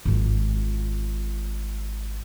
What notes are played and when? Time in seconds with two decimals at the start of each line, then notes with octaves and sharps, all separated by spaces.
0.05 G#1 F4